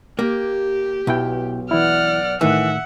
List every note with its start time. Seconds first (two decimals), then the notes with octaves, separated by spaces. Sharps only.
0.19 A#3 G4
1.07 B1 B2 E4 G5
1.71 E3 E4 D5 F#5 F6
2.41 A2 D#3 E3 E5 F#5 E6